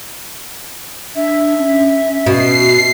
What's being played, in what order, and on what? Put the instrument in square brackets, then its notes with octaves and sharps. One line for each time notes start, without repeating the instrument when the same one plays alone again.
[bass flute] D4 [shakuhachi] E5
[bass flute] C#4
[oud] B2 [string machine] C7